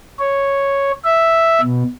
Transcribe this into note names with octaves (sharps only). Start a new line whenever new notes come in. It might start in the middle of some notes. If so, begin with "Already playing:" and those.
C#5
E5
B2